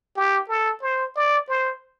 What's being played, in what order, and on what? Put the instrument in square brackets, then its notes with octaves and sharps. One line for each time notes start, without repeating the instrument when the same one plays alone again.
[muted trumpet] G4
A4
C5
D5
C5